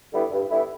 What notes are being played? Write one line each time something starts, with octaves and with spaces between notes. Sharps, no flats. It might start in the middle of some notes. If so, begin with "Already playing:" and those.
D3 G3 B3 E4
G2
D3 G3 B3 E4